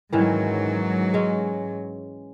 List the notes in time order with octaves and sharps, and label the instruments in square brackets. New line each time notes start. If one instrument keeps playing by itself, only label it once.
[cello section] G#2 F#3 [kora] D#3 E3 C#4
[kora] G#3 C#4